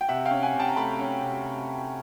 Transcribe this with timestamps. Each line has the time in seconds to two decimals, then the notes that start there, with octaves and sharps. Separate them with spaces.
0.01 G5
0.08 C3 E5 F#5
0.25 F5 G5
0.31 C#4
0.42 F#5 G#5
0.54 C3
0.60 G5 A5
0.68 A#5
0.76 A3 A5 B5
0.99 C#4
1.22 C3